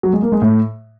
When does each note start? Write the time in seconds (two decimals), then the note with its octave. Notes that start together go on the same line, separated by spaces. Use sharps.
0.03 F#3
0.13 G#3
0.22 A#3
0.32 G#3
0.42 A2